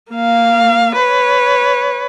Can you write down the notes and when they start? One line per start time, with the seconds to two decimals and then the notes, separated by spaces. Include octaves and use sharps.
0.12 A#3 F5
0.95 B4 C#5